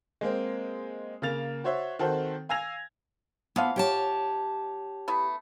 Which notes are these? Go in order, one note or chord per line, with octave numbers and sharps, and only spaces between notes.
G#3 A#3 C4
C#3 A#3 A6 F7
F#4 C5 C#5 E5
D#3 C4 F#4 A4 C5
F5 G#5 E6 G#6 A#6 F7
E3 F3 B3 F5
G4 C#5 A5
A3 B3 E4